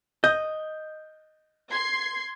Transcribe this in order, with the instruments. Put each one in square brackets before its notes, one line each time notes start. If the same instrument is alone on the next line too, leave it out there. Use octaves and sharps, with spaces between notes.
[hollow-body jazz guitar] D#5 [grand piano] G6
[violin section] C6 G#6 C7